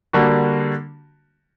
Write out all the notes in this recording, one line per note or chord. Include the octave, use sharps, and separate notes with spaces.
D3 G3 A#3 D4 F#4